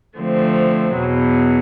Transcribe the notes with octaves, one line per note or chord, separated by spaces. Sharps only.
D3 F3 A3 C4
E2 B2 F#3